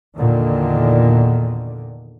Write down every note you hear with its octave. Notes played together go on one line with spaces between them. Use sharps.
E2 A#2 D3 D#3